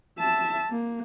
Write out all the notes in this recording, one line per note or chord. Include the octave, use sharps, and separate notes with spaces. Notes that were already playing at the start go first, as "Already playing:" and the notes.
E5 A5
A#3